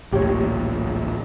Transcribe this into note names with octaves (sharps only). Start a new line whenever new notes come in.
A1 D2 A#2 G4 C#5